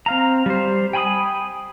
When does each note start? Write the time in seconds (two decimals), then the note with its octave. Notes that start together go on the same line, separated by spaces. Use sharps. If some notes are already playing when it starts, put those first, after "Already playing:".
0.06 C4 F5 A#5
0.46 G3 C5
0.93 G5 G#5 B5 C6 D#6